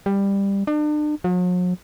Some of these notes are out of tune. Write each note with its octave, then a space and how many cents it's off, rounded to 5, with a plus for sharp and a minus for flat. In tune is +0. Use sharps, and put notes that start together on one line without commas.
G3 +15
D4 +40
F#3 -45